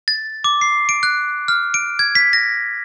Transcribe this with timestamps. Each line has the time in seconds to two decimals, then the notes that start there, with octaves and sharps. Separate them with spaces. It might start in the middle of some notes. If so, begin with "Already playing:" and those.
0.08 A6
0.44 D6
0.61 C7
0.89 D7
1.03 F#6
1.48 F6
1.74 D7
1.99 G#6
2.15 B6
2.33 A#6